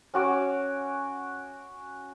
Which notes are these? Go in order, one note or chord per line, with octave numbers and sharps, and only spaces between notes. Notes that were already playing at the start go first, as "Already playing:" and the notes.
C#4 F#4 D6